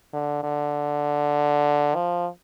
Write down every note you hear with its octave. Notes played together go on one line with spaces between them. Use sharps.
D3
D3
F3